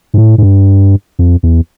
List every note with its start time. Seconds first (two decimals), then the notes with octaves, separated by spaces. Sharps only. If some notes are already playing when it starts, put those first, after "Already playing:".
0.14 G#2
0.18 A2
0.38 G#2
0.43 G2
1.19 F2
1.43 E2